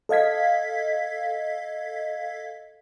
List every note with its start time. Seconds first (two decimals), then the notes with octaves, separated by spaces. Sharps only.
0.09 A4 D#5 F5 G#6 B6